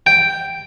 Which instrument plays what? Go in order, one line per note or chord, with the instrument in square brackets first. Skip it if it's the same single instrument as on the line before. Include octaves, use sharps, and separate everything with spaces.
[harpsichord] G5